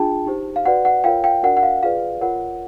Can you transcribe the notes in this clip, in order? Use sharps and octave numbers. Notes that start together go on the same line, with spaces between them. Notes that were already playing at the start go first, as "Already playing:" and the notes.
Already playing: D4 F4 G#4 G5 A5
D#4 G4 C5
F5
F#4 B4 D5 F#5
F#5
F4 A#4 C#5 F5 G5
F5 G5
D4 F#4 A#4 D5 F#5
F#5
F5
F4 G#4 B4 D5 F5
F4 A#4 C#5 F#5